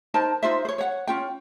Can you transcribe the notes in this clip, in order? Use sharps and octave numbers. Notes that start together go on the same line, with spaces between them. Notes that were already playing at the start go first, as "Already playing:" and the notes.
D#4 A#4 C5 A5
D#4 F4 C5 E5
C5 C#5
C#5 F#5
C#4 F4 G5